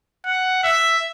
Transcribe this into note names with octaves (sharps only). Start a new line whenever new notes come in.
F#5
E5